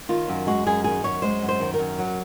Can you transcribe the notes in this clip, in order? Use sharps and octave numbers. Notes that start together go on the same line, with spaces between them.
D#3 F4
F#2
G#3 F#4
F#2 G#4
D#3 G#4
F#2 C#5
G#3 C5
F#2
C5
D#3
A#4
F#2
F#3